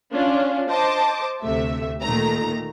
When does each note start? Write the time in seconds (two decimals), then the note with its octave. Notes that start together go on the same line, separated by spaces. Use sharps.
0.12 C#4 D4 F4
0.70 C5 D#5 A5 D6
1.42 D2 C3 A3 E5
2.02 A#2 D#3 A3 A#5